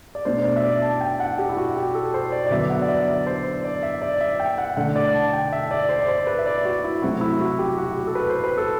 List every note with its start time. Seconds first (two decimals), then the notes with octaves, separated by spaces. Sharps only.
0.15 D5
0.25 B2 A3 D4 C5
0.44 D5
0.57 E5
0.64 D5
0.82 A5
1.01 G5
1.20 F#5
1.38 G4
1.49 E4
1.57 F#4
1.77 G4
1.95 A4
2.14 C5
2.32 D5
2.47 D5
2.51 D3 F#3 B3 D4 E5
2.70 F#5
2.82 D5
2.88 E5
3.08 D5
3.27 C5
3.64 D5
3.83 E5
4.02 D5
4.21 E5
4.40 G5
4.58 F#5
4.77 D3 A3 D4 F#5
4.96 D5
5.14 A5
5.33 G5
5.53 E5
5.71 D5
5.89 C5
6.02 D5
6.08 C5
6.27 B4
6.39 E5
6.46 D5
6.65 F#4
6.84 E4
7.02 C3 F#3 A3 C4 F#4
7.21 E4
7.40 F#4
7.59 G4
7.78 F#4
7.96 G4
8.07 A4
8.15 B4
8.29 C5
8.44 B4
8.57 A4